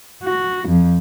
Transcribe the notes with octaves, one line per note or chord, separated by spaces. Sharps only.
F#4
F2